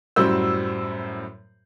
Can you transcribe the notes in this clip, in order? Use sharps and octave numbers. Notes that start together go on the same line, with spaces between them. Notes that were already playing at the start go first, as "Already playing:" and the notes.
F#2 A2 G3 F#4 C5 E6